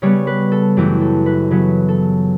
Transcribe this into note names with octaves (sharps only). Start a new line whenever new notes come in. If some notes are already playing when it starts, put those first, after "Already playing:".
C#3 G3 B3 C#5
B4
A4
F#2 E3 A3 G4
A4
B4
C#3 F#3 B3 B4
A4